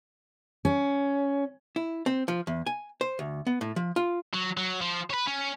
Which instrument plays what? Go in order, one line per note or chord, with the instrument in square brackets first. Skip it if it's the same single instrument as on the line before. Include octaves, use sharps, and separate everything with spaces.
[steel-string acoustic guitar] C#4
[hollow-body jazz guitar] E4
C4
F3
E2
G#5
C5
D2
B3
A2
F3
F4
[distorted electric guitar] F#3
F#3
F3
B4 C#5
C#4